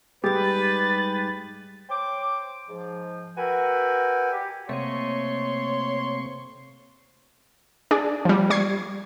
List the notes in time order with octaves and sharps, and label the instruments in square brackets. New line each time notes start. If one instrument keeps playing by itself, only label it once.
[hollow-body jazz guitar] G#2 G3 [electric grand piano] G4 G#4 [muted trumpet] B4 [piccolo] A6
[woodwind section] C5 C#5 G5 D6
G#2 F3
F#4 A#4 B4 E5 G5 G#5
G4
[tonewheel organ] C3 C4 C#6 [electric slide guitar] A3 A#3 D#5 [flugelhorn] C#5 [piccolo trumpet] C6
[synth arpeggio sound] D4 G#4 D5
F3 G3
G3 C#6 G#6 C7